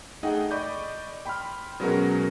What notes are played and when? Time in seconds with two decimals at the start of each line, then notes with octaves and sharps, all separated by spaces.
0.23 A3 D#4 G#4 D#5 F#5 G5
0.51 D5 D#5 B5 C#6 D6 G6
1.26 G5 B5 C6 F6
1.80 B2 F#3 G#3 C#4 F#4 A#4